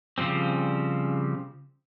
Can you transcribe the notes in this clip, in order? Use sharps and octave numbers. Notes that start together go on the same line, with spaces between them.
C#3 F3 G3 C4